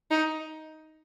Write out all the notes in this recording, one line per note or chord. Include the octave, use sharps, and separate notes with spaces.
D#4